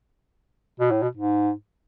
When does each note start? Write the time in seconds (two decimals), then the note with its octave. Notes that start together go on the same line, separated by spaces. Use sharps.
0.80 B2
0.91 A2
1.02 B2
1.17 G#2